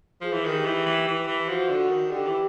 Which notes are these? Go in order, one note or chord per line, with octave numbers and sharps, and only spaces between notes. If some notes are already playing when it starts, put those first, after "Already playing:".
F3 G#4
E3
D#3
G4
E3
E3
E3
E3
F3 F#4
D3
D#3
D3 G4
E3